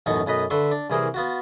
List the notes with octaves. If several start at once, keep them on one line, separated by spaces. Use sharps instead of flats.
A1 F#2 B2 D#4 C#6
B1 F#2 B4 D#5 A#5
D3 B4 E5 C6 C#6
D4
C2 E3 G#4 A#4 C5
B3 F4 F#4